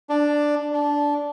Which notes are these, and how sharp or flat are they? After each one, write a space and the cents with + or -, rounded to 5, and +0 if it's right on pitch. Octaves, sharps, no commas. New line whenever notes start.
D4 +5
D4 -15